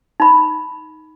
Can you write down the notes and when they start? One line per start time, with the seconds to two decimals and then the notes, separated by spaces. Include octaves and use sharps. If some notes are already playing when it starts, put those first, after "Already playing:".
0.20 D#4 B5